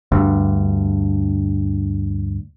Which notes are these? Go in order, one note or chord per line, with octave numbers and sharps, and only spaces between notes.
D2 G2